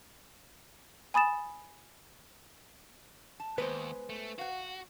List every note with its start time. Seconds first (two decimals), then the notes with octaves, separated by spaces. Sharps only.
1.14 G#5 B5 D#6 A6 E7
3.40 A5
3.58 D#2 G#3 B3 B4 C5
4.10 A3
4.38 F#4 F5 F#5